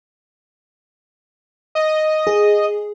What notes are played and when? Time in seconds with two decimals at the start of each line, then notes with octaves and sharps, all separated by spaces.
1.75 D#5
2.27 G#4